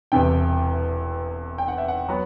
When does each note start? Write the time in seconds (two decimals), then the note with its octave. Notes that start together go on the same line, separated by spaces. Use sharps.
0.12 E1 E2 C3 G5
1.58 G5
1.68 F#5
1.78 E5
1.88 F#5
2.09 F#3 B3